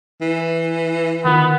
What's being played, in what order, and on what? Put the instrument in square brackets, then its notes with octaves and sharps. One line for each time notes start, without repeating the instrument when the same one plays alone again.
[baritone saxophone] E3
[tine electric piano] D3 D#3 F4 [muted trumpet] B3